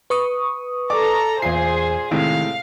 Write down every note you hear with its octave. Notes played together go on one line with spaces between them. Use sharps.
B4 C#6 D#6
A4 D5 A#5 D6
E2 A#2 G#4 C5 C7
A2 C3 D#3 G#3 F5